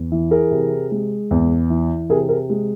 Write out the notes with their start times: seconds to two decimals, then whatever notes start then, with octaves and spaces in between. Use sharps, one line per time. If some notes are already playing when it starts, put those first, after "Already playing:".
Already playing: E2
0.12 E3
0.31 G#4 A#4
0.51 C3
0.91 G#3
1.31 E2
1.70 E3
2.09 C3 G#4 A#4
2.29 G#4 A#4
2.50 G#3